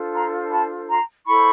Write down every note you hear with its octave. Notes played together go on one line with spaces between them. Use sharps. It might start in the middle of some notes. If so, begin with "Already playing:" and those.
Already playing: D4 F4 A4 C5
A#5 C6
A5 B5
A#5 C6
E4 A4 C5 B5 C#6